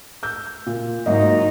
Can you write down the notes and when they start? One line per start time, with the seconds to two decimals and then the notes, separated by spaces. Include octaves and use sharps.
0.23 E6 G6
0.66 A#2
1.06 G#2 F#3 A#3 D#4 D#5